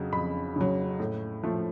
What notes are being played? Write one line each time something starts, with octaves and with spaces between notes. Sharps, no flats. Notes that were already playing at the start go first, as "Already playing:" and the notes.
Already playing: F2 C#3 F#3
F2 B5
C#3 F#3
A2
F3 A3